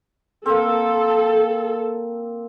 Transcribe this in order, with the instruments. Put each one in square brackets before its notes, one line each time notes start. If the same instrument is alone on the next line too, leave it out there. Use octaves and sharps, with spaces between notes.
[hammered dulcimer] A#3 C4 [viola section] A4